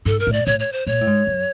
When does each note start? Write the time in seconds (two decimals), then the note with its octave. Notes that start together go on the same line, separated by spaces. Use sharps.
0.05 G#2 A4
0.20 A#4
0.27 A2
0.33 D5
0.46 A2 C#5
0.60 C#5
0.73 C5
0.87 A#2 C#5
1.01 A2
1.07 G#2
1.27 F#2